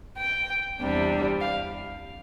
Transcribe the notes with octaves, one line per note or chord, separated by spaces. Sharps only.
G5
E2 C3 G3 D4
F5